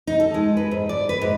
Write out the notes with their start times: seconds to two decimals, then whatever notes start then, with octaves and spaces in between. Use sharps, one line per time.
0.07 D#4
0.20 A4
0.34 G#3
0.57 B4
0.71 G#2
0.89 D5
1.09 B4
1.21 G#2